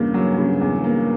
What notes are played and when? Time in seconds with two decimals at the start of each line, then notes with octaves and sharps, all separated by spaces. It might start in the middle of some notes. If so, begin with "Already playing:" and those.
Already playing: E2 G2 C#3 A#3
0.14 F#3
0.38 C#3
0.61 E2
0.84 A#3